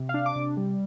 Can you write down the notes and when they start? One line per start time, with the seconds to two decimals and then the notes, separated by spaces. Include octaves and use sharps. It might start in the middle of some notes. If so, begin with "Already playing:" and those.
Already playing: C3
0.09 D4 F5
0.26 D6
0.36 C3
0.57 G3